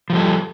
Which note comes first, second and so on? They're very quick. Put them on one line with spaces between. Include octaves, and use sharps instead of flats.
F3 G3 A4